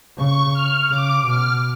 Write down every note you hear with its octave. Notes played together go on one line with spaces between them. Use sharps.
C#3 C#6
F6
C#3 D6
B2 F6